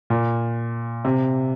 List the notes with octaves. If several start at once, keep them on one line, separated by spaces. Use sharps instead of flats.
A#2
C3